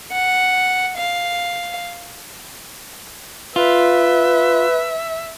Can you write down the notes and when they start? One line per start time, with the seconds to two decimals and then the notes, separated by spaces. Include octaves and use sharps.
0.12 F#5
0.98 F5
3.56 F4 B4 E5